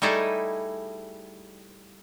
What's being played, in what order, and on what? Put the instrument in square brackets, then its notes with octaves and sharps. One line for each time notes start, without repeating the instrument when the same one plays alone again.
[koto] G3 A3 D#4 E4 G#4 A4